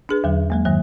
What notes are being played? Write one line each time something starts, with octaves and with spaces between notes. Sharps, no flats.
D4 G#4 B4
E2 D3 F#3
F#3 G#3 A#3
G2 D#3 F#3